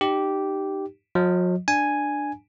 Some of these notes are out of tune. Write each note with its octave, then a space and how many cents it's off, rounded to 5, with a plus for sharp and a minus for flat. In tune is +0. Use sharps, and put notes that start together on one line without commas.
D#4 -30 G4 -10
F#3 -45 D#5 +0
D4 +10 G#5 +0